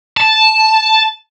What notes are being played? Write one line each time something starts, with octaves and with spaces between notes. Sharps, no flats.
A5